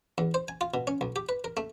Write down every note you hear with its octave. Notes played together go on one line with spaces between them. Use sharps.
E2
C5
G#5
F4
B2
C#4
B1
G4
B4
A#4
A3